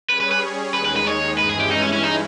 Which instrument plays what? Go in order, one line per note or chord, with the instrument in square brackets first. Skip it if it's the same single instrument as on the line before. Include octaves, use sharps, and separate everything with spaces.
[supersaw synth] G3 C#4 G#4 C#5 [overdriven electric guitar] B4
[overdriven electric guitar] B4
B4
[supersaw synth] D#2 D#3 G#3 D#4 G#4 [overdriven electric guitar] B4
[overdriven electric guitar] B4
B4
C#5
[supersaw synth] G2 E3 G#3 C#4 E4 [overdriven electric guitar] B4
[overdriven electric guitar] G#4
G4
D#4
C#4
C#4
D#4